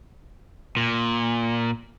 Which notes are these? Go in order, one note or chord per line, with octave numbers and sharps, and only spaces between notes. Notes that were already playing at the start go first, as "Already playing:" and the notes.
A#2